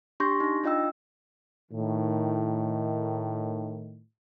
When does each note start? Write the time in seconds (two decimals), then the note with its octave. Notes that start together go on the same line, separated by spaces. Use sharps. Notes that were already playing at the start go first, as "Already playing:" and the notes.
0.20 D4 G4 C6 C#6 G6 A#6
0.40 D#4 A#6
0.64 D4 F4 D#5 G5 E6
1.72 A2 D#3